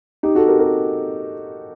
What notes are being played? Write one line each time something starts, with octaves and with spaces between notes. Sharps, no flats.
D#4 G4
F#4 A4
G4 A#4
G4 A#4